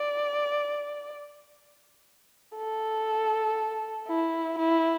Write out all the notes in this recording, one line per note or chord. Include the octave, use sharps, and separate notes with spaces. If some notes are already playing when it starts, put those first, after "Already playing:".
Already playing: D5
A4
E4
E4